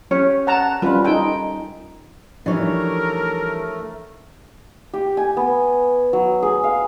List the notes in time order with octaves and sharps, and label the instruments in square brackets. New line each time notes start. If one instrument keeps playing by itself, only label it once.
[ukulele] C#4 G4 C#5
[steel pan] F#5 A5 A#5
[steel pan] G3 C#4 F4 [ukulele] B4 B5
[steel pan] D#4 G5 [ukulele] A4 G#5
[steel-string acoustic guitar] E3 G3 C#5 [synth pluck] F3 D4 D#4 [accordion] A3 [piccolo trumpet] A#4
[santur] G4
G#5
B3
F#3
G#4
F5